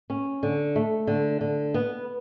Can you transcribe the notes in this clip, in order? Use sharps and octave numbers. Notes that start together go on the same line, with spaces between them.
C#4
D3
A3
D3
D3
B3